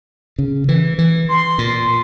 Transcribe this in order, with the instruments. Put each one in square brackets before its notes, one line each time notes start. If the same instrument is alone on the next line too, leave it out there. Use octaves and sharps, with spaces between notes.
[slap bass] C#3
E3
E3
[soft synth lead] C6
[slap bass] A#2